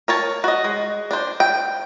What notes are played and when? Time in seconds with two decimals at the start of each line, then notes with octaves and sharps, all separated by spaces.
0.08 A#4 C#5 A5
0.44 F#4 D#5
0.64 G#3
1.11 D4 C5
1.40 G5